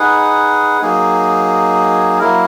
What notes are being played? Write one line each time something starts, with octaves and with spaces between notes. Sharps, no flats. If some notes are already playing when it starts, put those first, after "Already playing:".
Already playing: D#4 G#4 B4 F#5
F#3 A#3 D#4 G#4
F#3 A#3 E4 A#4